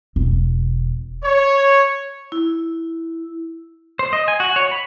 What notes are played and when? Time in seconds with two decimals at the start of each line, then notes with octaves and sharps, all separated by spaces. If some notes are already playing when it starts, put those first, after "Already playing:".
0.16 E1
1.24 C#5
2.32 E4
3.99 C5
4.13 D#5
4.28 G#5
4.40 F#4
4.56 C#5
4.71 B5